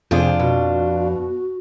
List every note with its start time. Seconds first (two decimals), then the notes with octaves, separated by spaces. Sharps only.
0.11 F2 C3 D4 F4 G#4
0.39 B2 F#4